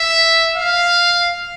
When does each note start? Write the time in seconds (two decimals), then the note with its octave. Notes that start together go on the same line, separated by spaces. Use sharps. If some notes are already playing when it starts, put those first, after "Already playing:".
Already playing: E5
0.56 F5